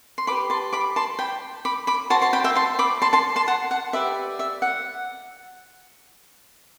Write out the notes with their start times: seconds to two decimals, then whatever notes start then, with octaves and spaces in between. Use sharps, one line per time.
0.18 C6
0.27 G4 B4 D5 B5 D6
0.50 A5 C6
0.73 B5 D6
0.96 A5 C6
1.19 G5 B5
1.65 B5 D6
1.87 B5 D6
2.10 F#4 C5 A5 C6
2.22 A5 C6
2.33 G5 B5
2.44 E5 G5
2.56 A5 C6
2.79 B5 D6
3.02 A5 C6
3.13 A5 C6
3.36 A5 C6
3.48 F#5 A5
3.71 F#5
3.93 G4 B4 D5 E5
4.39 E5
4.62 F#5